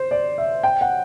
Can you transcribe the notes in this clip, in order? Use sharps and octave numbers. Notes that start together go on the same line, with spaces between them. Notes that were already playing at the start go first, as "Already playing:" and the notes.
Already playing: C5
D5
E5
G5
F#5